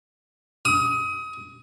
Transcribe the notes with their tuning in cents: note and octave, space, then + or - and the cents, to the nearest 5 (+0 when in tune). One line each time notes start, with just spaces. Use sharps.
D#6 +30